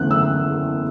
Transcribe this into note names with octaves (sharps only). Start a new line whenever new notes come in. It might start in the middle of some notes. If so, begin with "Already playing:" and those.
Already playing: F#1 E2 D3 A3 F#6
E6